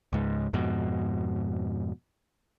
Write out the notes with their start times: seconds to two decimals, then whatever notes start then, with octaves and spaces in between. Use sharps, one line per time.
0.13 C#2 G#2
0.53 F2 G#2 B2